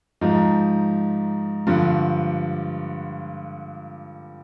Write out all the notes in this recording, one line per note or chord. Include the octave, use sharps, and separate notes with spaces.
G#2 F3 D#4
G2 D3 F3